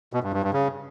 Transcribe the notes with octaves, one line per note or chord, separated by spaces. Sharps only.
B2
G2
G2
G2
C#3